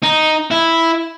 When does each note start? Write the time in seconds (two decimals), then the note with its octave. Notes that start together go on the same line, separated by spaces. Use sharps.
0.03 D#4
0.51 E4